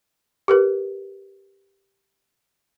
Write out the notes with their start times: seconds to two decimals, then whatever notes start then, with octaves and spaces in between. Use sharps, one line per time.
0.48 G4 A#4 B4